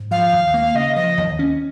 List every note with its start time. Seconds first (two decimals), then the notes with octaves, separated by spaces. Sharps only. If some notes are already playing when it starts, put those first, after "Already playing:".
Already playing: G#2
0.11 F3 F5
0.32 D#2
0.54 A#3
0.75 C#3 D#5
0.96 F3 D#5
1.18 D#2
1.39 C#4